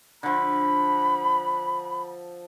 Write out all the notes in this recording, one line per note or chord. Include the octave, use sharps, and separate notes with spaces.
D3 F3 B5